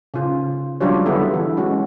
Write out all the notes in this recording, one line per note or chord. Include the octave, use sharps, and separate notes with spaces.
C#3 F4
F#3 G3 D4 F4 G4 C#5
D3 B3 E4 G#4 A4
E3
G#3 C#4 F#4